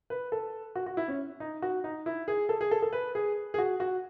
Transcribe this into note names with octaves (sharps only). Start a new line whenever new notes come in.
B4
A4
F#4
F#4
E4
C#4
D#4
F#4
D#4
E4
G#4
A4
G#4
A4
A4
B4
G#4
G#4
F#4
F#4